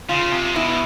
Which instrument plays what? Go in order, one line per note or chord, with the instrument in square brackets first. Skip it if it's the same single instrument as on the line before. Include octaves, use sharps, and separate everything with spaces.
[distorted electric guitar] C#3 [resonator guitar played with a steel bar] F4
[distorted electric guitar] C3
[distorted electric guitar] B2 [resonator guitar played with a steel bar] E4